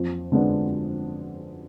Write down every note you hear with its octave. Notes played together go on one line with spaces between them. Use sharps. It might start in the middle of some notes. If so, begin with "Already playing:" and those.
Already playing: F2
D3 G#3 B3 D4